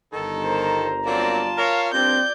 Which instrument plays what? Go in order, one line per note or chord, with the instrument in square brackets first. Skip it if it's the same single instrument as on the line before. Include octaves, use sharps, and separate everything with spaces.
[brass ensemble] G1 A#5 [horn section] D#3 A4
[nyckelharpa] A#4 C5
[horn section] F#3 A#3 C4 [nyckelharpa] F4 A5 [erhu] D5
[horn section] A#4 C#5 [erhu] F5
[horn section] G2 A#3 D4 [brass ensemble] C4 [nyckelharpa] D5 [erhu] G6